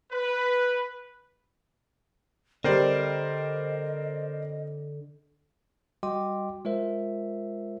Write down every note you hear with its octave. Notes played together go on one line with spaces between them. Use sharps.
B4
D3 G3 C4 A#4 C5 D5 D#5
G3 F#4 D#5 G5 C6 D6
G#3 F4 A#4 C5 E5